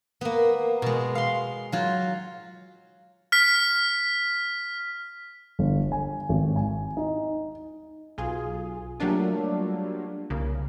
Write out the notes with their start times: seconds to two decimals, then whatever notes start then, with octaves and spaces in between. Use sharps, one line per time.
0.21 A#3 B3
0.82 B2 G#3
1.15 F5 C6
1.72 F#3 F4
3.32 F6 B6
5.59 G1
5.92 G#5
6.29 G#1
6.56 G#5
6.97 D#4
8.18 B1 F4 G#4
9.00 F#3 G3 A3 A#3 D4 F4
10.30 C2 C#3 A#3